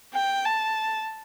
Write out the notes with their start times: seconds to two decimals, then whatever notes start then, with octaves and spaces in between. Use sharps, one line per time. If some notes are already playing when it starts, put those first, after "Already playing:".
0.14 G5
0.45 A5